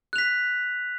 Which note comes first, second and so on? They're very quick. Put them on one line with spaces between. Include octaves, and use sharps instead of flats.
F#6 F7 B6